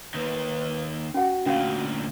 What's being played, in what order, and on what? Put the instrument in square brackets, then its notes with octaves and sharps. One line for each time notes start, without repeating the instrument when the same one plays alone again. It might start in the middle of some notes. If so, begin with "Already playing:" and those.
[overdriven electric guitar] D#2 D#3 [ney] B4
[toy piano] C#4 F#5 [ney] F#4
[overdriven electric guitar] D2 A#2 [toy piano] C#4 F5